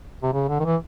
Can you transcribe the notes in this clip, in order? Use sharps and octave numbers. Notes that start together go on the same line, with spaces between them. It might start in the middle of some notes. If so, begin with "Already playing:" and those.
C3
C#3
D3
D#3
E3